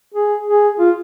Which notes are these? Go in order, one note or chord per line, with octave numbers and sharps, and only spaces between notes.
G#4
G#4
F4